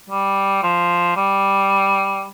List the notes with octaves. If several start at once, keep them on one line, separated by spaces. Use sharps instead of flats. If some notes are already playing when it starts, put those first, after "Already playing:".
G3
F3
G3